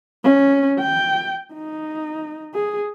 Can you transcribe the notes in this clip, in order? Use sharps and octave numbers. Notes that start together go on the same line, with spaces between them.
C#4
G5
D#4
G#4